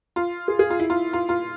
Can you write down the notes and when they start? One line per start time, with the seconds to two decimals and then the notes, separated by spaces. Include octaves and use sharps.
0.16 F4
0.48 G#4
0.59 G#4
0.70 F4
0.80 E4
0.90 F4
1.13 F4
1.29 F4